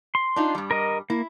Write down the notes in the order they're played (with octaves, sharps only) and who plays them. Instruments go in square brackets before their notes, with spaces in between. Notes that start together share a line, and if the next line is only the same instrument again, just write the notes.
[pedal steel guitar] C6
[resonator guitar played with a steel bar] D4 D#4 F4
G2 G3
[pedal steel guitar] A#4 D#5
[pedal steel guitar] A#3 [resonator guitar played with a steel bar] E4